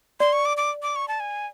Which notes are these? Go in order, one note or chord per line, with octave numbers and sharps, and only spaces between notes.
D5 C6
C#6
D6
D6
D6
C#6
A5
G#5